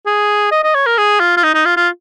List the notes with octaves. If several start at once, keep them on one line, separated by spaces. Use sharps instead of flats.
G#4
D#5
D#5
C#5
A#4
G#4
F4
F4
D#4
D#4
F4
F4